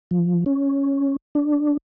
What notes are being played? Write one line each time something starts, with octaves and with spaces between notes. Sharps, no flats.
F3
C#4
D4